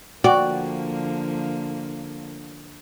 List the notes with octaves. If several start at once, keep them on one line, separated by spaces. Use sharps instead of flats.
D3 F3 A#3 F#4 D5 G5